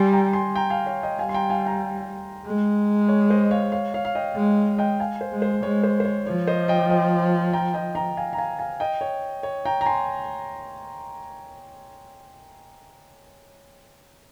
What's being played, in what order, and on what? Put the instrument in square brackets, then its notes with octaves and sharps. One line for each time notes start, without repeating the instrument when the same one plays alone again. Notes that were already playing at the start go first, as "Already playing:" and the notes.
Already playing: [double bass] G3 [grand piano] G#5 C6
[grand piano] G5 A#5
G#5 C6
G5 A#5
F5 G#5
C#5 F5
D#5 G5
[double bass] G3 [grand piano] F5 G#5
[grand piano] C6
G5 A#5
F5 G#5
G5 A#5
[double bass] G#3
[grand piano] C#5
C5 D#5
C#5 F5
C#5 F5
C#5 F5
F5
D#5 G5
[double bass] G#3
[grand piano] D#5 G5
F5 G#5
C5
[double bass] G#3
[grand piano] C5
[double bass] G#3 [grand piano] C#5
[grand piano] C5
C5
C#5
[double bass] F3 [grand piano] C#5
[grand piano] C5 D#5
D#5 G5
D#5 G5
G5 A#5
D#5 G5
G5 A#5
F5 G#5
A#5
F5 G#5
F5 G#5
D#5 G5
C#5
C#5
G5 A#5
A#5
G#5 C6